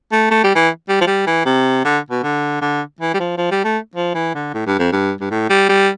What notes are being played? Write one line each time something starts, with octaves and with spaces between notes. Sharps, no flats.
A3
A3
G3
E3
G3
F3
G3
E3
C3
D3
B2
D3
D3
E3
G3
F3
F3
G3
A3
F3
E3
D3
A2
G2
F2
G2
G2
A2
G3
G3